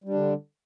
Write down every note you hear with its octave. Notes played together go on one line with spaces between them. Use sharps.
D3 G3 D4